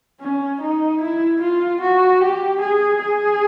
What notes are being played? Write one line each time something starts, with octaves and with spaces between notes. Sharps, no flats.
C#4
D#4
E4
F4
F#4
G4
G#4
G#4